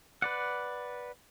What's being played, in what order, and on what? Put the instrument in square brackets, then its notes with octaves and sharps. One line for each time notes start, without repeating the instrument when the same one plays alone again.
[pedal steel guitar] B4 D5 F#5